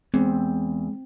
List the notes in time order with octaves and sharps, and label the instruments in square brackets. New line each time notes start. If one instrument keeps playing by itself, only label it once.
[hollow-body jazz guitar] E2 [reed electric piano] G#3 [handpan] C4